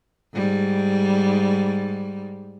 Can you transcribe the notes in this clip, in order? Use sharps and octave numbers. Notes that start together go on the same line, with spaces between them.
G#2 G3